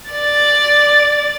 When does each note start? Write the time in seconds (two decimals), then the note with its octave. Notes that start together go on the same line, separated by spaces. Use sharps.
0.11 D5 A6